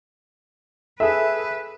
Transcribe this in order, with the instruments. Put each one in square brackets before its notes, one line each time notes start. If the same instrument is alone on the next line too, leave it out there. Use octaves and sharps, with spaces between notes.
[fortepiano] G#4 E5 [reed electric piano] A4 [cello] B4